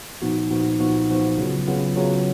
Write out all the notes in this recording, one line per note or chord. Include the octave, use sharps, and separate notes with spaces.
A#2 F3 B3 D#4 F#4
A#2 F3 B3 D#4 F#4
A#2 F3 B3 D#4 F#4
A#2 F3 B3 D#4 F#4
C#3 F#3 B3 F4
C#3 F#3 B3 F4
C#3 F#3 B3 F4